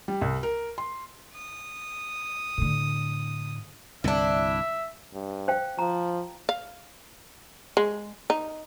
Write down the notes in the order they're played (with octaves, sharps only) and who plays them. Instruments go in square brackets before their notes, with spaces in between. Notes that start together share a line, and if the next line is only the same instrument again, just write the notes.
[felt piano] G3
C2
A#4
C6
[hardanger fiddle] D#6
[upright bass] A2 D3
[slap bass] C2 G2 D3 [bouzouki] D4 E4 [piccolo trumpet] E5
[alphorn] G2
[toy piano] C5 F5 G5
[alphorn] F3 [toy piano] A#5
[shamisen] F5
G#3
D#4